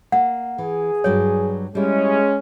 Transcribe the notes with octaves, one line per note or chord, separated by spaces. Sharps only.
A#3 F#5
E3 G#4
G2 F#3 C#5 G5
G3 G#3 C#4 E4